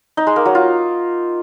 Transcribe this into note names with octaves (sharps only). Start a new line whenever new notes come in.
D#4
G#3
A#3
F#3
F4